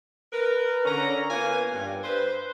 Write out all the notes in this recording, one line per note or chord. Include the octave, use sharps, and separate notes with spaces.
A#4 B4
D3 C#4 A#5
A#3 B3 F4 A#4 B4 G#5
G2
B4 C5